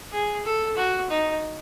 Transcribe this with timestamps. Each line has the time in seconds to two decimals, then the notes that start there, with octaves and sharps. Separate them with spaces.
0.12 G#4
0.45 A4
0.77 F#4
1.10 D#4